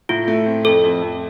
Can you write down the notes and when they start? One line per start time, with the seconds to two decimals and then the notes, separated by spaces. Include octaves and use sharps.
0.09 A2 F4
0.28 A3
0.46 C4
0.65 F2 A4
0.84 F2
1.02 F2